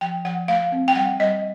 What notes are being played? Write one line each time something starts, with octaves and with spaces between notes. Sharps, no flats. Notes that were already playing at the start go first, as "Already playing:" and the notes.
F3 G5
F3 F#5
A3 F5
C4
G5
G3 F#5
G3 D#5